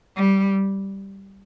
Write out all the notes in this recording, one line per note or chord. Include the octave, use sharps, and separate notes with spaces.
G3